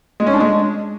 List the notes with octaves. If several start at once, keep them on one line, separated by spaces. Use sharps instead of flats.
G#3
C#4
D4
G#3